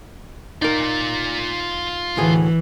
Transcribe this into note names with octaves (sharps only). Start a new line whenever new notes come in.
D#4 F4 A#4 D5
D2 A2 E3 G#4